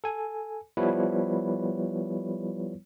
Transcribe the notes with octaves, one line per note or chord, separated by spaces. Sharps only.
A4 G#5
F3 G3 B3 E4 B4 C#5